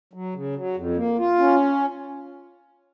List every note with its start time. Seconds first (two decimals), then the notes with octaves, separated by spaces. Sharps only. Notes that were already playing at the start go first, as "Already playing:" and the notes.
0.13 F#3
0.34 C#3
0.56 F#3
0.77 F2
0.97 A#3
1.18 F4
1.39 C#4